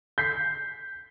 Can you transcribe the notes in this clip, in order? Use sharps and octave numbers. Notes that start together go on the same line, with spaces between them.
G6 B6 C7